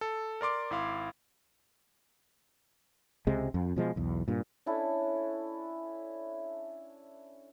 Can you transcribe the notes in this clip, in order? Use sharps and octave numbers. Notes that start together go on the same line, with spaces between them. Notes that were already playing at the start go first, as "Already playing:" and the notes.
A4
A#4 D5 C6 D6
G#1 E4 F5 C6
C#2 C3 G#3
F2
B2 F3 G#3
B1 E2
G2 A#2
C#4 D4 E4 A4